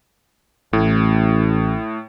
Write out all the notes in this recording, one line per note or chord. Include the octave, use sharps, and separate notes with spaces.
A1 A2